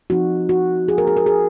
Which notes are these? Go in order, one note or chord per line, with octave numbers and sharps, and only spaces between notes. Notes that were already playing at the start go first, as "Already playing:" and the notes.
F3 C4 D#4 F#4
F#4
G#4
A#4
G#4
A#4
G#4